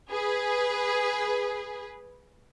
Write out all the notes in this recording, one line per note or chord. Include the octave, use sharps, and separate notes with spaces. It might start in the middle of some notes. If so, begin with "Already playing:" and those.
G#4 B4